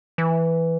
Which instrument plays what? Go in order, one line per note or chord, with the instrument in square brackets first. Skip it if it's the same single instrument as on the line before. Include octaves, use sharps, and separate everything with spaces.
[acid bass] E3